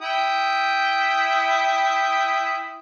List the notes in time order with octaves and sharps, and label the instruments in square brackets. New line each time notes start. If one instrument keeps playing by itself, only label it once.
[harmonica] E4 G5 D#6